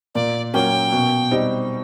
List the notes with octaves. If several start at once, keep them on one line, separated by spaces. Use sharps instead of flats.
A#2 D5
F#3 A#3 C#4 G5
B2
G3 C4 D#4